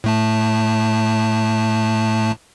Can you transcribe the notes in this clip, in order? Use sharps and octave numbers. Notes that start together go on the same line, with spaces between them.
A2 A3 A5